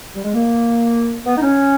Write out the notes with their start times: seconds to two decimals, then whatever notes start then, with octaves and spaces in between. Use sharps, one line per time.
0.14 G3
0.24 G#3
0.34 A#3
1.26 B3
1.37 D#4
1.42 C#4